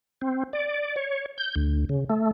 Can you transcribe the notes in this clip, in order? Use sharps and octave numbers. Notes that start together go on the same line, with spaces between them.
C4
D5
C#5
G6
D2
C#3
A3